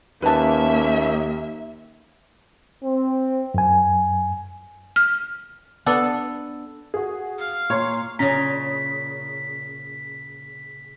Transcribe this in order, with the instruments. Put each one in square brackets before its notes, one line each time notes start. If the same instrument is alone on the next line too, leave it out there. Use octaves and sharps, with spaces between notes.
[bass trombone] D#2 [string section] A#3 E5 [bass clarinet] C#4 [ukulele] B4 A5
[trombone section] C4
[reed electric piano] F#2 G#5
[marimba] F6
[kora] B3 D4 A4
[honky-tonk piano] F#4 G#4
[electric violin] F5
[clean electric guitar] A#2 [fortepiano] C#5 [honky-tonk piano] C7
[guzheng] A#2 C#3 [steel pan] C#4 A#5 [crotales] B6